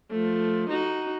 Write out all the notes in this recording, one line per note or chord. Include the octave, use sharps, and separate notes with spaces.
F3 A3
D#4 F#4